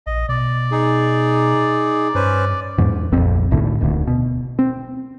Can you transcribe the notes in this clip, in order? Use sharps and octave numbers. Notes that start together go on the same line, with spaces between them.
A#1 D#5
B2 D5
D#4 G#4
G2 C#4 B4 C5
E2 G#2
D1 A#1 F2 C4
D#1 B1 A2 D3
D#1 D2
B2
C4